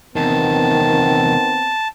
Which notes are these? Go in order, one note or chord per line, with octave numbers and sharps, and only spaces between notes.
E2 C3 D#3 B3 C4 A5